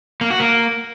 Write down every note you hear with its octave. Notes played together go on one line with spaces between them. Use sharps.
A#3
F#4
A#3